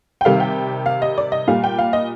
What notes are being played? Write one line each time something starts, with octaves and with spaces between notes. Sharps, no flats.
G5
C3 D#3 G3 F5
G5
F5
D#5
D5
D#5
A#2 G3 F5
G5
F5
D#5